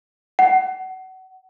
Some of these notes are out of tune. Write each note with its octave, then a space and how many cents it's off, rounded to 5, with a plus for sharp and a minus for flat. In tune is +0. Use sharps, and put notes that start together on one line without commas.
F#5 +30